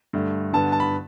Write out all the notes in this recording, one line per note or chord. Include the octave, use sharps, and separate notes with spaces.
G2 D3 A3
G2 D3 B3 A5
A5
B5